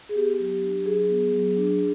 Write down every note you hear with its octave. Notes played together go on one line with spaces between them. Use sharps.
G#4
B3 G4
F#3
G4
D4
F#3 G#4
B3
F#3
D4